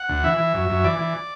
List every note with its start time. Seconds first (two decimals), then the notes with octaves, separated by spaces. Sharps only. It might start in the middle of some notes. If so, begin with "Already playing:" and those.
Already playing: F#5
0.09 D2
0.24 E3 E5
0.38 E3
0.54 F#2
0.69 F#2
0.84 E3 D5
0.99 E3